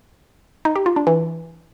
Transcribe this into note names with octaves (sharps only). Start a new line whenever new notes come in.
D#4
G4
F4
D4
E3